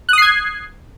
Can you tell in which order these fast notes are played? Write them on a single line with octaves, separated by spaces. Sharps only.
F#6 D#6 C7 G#6